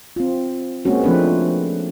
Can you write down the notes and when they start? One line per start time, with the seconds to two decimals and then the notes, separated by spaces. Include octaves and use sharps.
0.16 C4 F4
0.85 G#3 A#3 C4 C#4 F#4
1.04 F3 A3 C4 D4 B4